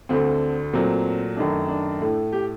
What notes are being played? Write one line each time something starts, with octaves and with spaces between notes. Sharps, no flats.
D2 D3 A3 C4
A#2 F#3 A3 C4
F#2 D#3 A3 D4
D4
A2 A3
G4